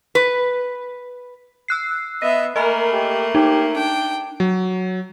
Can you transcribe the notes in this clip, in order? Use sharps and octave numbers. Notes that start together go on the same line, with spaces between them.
B4
E6 F#6 C7
B3 D#5 E5
A3 A#3 A#4 D#5 G#5 B5
G4
D#4 G4
D4 G5
F#3